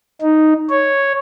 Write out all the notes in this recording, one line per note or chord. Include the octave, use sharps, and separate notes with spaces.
D#4
C#5